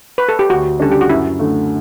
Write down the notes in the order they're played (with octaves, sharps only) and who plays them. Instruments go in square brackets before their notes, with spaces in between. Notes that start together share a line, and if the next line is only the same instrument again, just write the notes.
[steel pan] B4
A4
G4
[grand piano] D2 [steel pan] F#4
[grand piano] C#3 G3 D4 [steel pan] A4
[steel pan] G4
F#4
[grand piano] F#2 [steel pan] E4
[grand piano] D3 A3